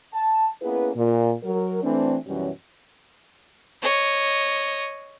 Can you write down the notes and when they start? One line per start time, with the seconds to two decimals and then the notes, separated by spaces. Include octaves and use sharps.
0.14 A5
0.62 A#3 B3 C#4 E4 G#4 B4
0.96 A#2
1.44 F#3 A#4
1.83 E3 A3 C4 D4
2.26 F#2 B2 E3 F#3 G3 C#4
3.82 C#5 D#5